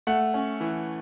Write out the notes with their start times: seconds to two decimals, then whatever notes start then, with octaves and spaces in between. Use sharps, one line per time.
0.07 A3 F#5
0.34 C#4
0.61 E3